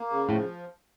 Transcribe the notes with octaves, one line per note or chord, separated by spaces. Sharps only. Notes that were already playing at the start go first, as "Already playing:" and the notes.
Already playing: A#3
C#3
A2 F3